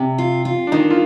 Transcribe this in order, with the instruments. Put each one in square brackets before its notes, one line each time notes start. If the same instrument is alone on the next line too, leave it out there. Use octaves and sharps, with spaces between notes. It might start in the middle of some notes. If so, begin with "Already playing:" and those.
Already playing: [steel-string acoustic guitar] C3
F4
F4
[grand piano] D4
[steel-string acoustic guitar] D#3 [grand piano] D#4
[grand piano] F4